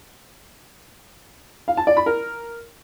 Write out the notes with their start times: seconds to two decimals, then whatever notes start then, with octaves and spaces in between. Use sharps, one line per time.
1.68 F5
1.77 A5
1.87 D5
1.97 B5
2.06 A#4